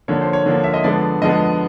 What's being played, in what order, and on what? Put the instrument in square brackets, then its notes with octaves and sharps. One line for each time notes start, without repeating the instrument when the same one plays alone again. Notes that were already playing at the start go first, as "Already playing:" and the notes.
[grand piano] D3 F3 A#3 C#5
C5
C#5
D3 F3 A#3
E5
D#5
D3 F3 G#3 B3 D5
D3 F3 G#3 B3 D#5